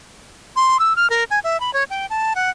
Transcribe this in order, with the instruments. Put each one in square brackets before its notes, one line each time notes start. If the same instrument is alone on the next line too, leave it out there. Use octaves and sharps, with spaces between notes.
[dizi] C6
E6
F6
A#4
G#5
E5
B5
C#5
G5
A5
F#5